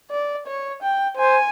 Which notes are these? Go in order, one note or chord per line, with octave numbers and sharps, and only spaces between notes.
D5
C#5
G5
C5 G#5